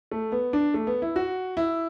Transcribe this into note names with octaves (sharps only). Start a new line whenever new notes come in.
A3
B3
D4
A3
B3
E4
F#4
E4